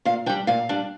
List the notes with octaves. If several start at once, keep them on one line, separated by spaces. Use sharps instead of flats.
A#2 F5
G3 D4 G5
A#2 F5
G3 D4